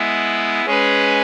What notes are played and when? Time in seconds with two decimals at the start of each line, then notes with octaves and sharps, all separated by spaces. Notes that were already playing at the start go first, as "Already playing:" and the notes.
Already playing: G#3 B3 E4
0.65 G#3 C#4 G#4 B4